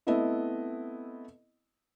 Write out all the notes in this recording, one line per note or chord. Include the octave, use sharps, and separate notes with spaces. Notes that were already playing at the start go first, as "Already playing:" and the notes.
A3 B3 C4 E4 D#5